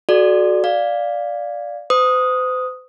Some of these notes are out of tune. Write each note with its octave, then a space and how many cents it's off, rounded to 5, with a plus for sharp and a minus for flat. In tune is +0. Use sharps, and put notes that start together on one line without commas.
F#4 +0 A4 -35 D5 +10
D5 +0 F5 +0
C5 -45 D#6 +0